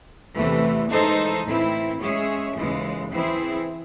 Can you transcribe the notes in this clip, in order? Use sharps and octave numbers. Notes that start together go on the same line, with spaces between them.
E2 C3 E3 A3
E3 G#3 D#4 A4 C5
A2 E3 C4 E4
G#3 C#4 G#4 C#5 E5
D#2 C#3 E3 G#3
E3 C4 E4 G#4